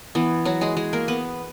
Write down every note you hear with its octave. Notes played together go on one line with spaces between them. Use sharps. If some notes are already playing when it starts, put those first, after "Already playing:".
E3 B3
F#3 F#4
G#3 G#4
G#3 G#4
A#3 A#4
B3 B4